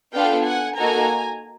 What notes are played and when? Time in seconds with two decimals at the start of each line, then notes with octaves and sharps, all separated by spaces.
0.14 B3 D4 F4 A4 F5 G5
0.45 F#5 G#5
0.77 A#3 D#4 F#4 A4 G#5 A#5